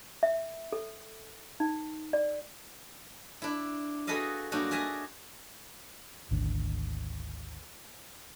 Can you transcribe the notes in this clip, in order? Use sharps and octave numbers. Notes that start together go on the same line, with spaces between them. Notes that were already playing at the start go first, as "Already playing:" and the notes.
E5
A4
D#4
D5
D4 E4
F#4 G#4 A4 B4 D#5 F5
G2 F#3 A#3 D4 D#4 F#4
G#4 A#4 E5 G#5 A5
G#1 D2 D3